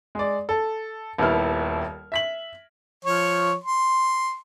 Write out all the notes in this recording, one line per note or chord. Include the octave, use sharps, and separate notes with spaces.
G#3 D5
A4
D#1 D#2 B3 E4 F6
E5 B6 F#7
F3 C#5
C6